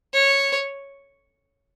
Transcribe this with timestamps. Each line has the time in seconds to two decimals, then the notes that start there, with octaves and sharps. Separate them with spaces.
0.13 C#5